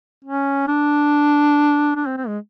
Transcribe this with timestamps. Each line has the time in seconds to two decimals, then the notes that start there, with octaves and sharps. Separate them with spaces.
0.25 C#4
0.68 D4
1.96 D4
2.06 C4
2.17 C4
2.27 G#3